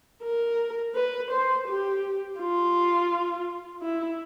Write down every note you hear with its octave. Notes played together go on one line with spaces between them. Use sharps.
A#4
B4
C5
G4
F4
E4